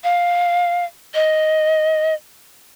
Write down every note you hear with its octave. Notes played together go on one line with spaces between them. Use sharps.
F5
D#5